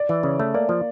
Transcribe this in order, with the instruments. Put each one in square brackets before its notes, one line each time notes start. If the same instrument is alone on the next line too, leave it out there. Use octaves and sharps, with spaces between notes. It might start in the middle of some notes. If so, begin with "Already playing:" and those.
Already playing: [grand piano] D5
[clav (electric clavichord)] E3
[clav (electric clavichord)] C#3 [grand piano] C#5
[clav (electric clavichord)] A3
[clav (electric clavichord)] A#3 [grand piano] D5
[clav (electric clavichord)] F3